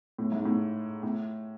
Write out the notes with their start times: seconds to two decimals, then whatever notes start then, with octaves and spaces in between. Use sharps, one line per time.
0.18 A2
0.32 G#2
0.45 A2
1.03 A2